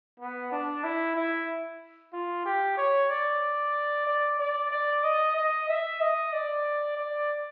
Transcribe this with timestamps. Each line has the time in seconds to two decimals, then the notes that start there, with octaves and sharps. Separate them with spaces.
0.20 B3
0.52 D4
0.84 E4
1.16 E4
2.13 F4
2.45 G4
2.77 C#5
3.10 D5
4.07 D5
4.39 D5
4.71 D5
5.04 D#5
5.36 D#5
5.69 E5
6.00 D#5
6.33 D5
6.97 D5